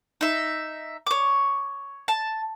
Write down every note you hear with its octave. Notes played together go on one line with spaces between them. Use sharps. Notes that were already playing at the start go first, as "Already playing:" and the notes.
D#4 E5
C#5 D6
A5